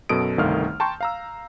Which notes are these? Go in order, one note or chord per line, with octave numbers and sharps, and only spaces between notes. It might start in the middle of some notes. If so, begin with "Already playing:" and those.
F#2 B2 A4 D#6 D7
G1 C2 D#3 A3 F5 F6
G5 A5 A#5 C6 C#6 G6
F5 A#5 E6